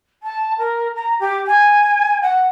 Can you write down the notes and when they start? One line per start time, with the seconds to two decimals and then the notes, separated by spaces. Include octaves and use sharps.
0.23 A5
0.58 A#4
0.96 A#5
1.20 G4
1.47 G#5
2.22 F#5